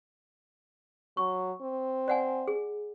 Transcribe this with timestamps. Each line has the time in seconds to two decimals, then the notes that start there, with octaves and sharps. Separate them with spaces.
1.17 F#3 C#6
1.61 C4
2.08 D5 F#5 G#5
2.47 G#4